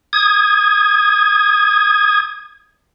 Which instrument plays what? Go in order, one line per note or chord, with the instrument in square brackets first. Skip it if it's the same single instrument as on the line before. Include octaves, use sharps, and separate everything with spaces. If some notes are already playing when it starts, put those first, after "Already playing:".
[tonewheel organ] D#6 G#6